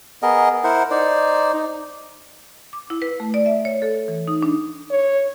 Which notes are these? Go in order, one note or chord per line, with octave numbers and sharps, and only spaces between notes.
B3 G#4 A#4 D#5
E4 A#4 C5 F#5
D#4 C5 D5
D#4
D6
E4
B4
A3
D5
E5
C#5
A4
E3
D#4
D4
C#5